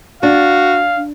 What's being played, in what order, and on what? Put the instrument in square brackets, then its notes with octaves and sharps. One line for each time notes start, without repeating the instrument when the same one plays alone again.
[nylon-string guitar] D4 [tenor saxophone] F#4 [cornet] F5